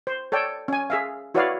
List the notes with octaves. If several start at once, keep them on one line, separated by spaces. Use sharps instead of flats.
C5
A4 C#5 D5 G5
C#4 G#5
G#4 E5 F5
E4 F#4 B4 C#5 D5 F5